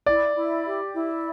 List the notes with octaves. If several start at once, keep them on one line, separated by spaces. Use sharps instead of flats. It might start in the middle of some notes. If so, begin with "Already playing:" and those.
E4 D5
E4
G4
E4